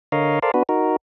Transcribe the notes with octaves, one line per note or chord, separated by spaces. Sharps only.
D3 A#4 C#5 D#5 F5
A4 A#4 C5 D5 F5
B3 D4 F#4 B4
D#4 F#4 A#4